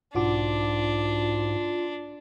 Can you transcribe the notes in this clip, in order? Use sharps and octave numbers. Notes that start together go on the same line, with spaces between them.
B1 G#2 D4 F4 F#4 D6